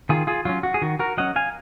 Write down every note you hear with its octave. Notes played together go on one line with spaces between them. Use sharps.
D#3 F4 G#4
F4 G#4
F#3 C#4 F4
F#4
G#4
D#3 F#4
F#4 A#4
F#3 C#4 D#5 F#5
F5 G#5